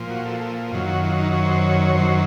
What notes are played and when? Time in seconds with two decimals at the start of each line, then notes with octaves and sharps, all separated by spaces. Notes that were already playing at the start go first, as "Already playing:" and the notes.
Already playing: A#2 F3
0.10 F#4
0.26 A4
0.41 A4
0.71 F#2 D#3 F#3 F4
0.88 F#4
1.03 F4
1.18 D#4
1.34 C#5
1.45 C5
1.58 C#5
1.85 C#5
1.95 F#2 D#3 F#3 C5